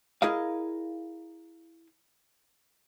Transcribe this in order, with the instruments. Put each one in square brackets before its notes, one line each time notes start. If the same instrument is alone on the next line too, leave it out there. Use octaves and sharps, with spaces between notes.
[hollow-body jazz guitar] E4 G#4 A#4 D#5 F5